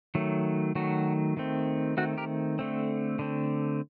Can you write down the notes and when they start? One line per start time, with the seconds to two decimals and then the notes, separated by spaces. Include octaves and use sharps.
0.15 D#3 F#3 A3
0.75 D#3 F#3 A3 F#4
1.37 D#3 A3 C4
1.97 D#3 A3 C4 F#4
2.18 G4 A#4
2.59 D3 A3 C4
3.19 D3 A3 C4